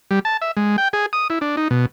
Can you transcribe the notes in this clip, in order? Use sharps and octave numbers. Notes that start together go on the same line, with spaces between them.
G3
A5
E5
G#3
G5
G#4
D#6
E4
D4
D#4
B2